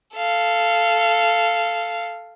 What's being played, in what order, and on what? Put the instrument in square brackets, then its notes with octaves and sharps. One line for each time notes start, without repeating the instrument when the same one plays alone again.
[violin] A4 F5